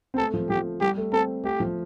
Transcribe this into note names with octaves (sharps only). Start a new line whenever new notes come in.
C4
A3 A4
F3
F3 G4
G3 G4
A3
C4 A4
A3 G4
F3